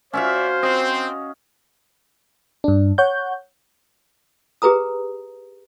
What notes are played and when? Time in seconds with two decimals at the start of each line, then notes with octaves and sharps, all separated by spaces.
0.13 C#4 F#4 C5 D5 E5 F5
0.63 C4 D#5
2.64 G2 D4
2.98 C#5 F#5 G6
4.62 G4 G#4 B4 A#5 D#6